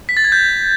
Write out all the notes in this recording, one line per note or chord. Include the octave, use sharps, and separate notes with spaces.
B6
A6
G#6
G6